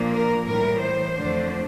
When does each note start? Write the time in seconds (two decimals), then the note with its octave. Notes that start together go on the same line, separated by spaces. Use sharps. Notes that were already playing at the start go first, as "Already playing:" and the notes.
Already playing: A#2 F3 A#3 D4
0.13 A#4
0.47 A2 E3 G3 A#4
0.81 C5
1.15 F2 D3 A3 D4